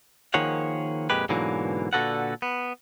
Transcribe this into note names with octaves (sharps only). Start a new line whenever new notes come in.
D#3 F3 A#3 G#4 C#5 F#5
F2 A#2 G#3 G4 B4
G#2 B2 D3 E3 F#3 A#3
A#2 D3 F#4 A4 B4 F#5
B3